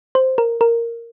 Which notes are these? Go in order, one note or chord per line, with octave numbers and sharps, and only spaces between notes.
C5
A#4
A#4